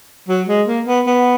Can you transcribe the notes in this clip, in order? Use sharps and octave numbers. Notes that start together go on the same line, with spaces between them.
F#3
G#3
A#3
B3
B3